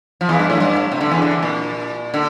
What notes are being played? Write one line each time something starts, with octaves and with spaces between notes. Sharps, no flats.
F3
E2 E3
G2
A2
G2
A2
C3
D3
E2 E3
D3
C3
A#2
D3